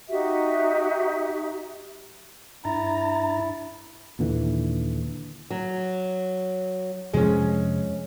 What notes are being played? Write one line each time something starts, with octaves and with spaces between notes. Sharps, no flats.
D#4 F#4 G4 E5
G2 D4 E4 A#5 A6
D#2 A#2 D3 E3
F#3
F2 C3 F3 G#3 C#4